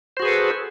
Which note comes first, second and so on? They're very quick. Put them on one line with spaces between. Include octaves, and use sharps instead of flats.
C5 F#4 G#4 B4 A4